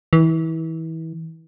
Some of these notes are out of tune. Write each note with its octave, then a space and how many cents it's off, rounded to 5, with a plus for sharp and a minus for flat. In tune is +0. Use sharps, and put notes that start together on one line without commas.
E3 -30